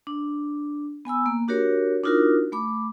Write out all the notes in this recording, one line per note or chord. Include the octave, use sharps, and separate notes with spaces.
D4
B3 G#5 B5 E6
A#3
D4 F#4 G4 A#4 C#5
D4 D#4 F4 F#4 A#4
A3 B5 D6